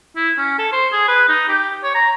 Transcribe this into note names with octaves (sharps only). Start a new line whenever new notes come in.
E4
C#4
A4
C5
G#4
B4
D#4
G4
C#5
A#5